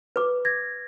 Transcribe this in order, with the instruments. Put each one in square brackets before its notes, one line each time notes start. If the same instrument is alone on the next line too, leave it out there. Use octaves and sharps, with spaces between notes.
[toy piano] B4 D6
[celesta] G#6 A#6